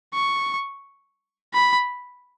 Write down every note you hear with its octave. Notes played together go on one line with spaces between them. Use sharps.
C#6
B5